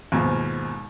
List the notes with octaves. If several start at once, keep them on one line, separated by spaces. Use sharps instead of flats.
D#2 G#2 B2 F3